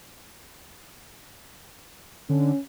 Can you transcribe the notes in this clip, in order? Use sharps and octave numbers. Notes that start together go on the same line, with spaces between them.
D3 C#4